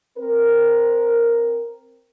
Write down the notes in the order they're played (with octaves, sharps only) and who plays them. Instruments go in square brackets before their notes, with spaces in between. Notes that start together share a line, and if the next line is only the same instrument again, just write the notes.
[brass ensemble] C4 A#4